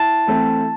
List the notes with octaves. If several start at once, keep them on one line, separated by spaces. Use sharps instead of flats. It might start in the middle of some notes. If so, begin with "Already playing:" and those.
Already playing: E4 A5
E3 A3 C4 E4